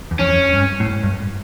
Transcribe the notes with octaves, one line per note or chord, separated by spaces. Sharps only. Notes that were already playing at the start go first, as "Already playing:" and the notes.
E2
F2 C#4
G2
A2
G#2
G2